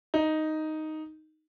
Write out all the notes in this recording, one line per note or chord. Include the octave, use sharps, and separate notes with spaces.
D#4